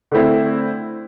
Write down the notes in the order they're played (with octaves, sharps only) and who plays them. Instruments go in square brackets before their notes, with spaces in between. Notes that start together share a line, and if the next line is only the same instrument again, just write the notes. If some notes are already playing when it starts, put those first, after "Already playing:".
[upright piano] D3 A3 C4 E4